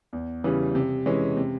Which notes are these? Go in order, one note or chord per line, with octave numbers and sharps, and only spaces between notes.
E2
C#3 E3 G3
C3
E3 G#3 C#4
C3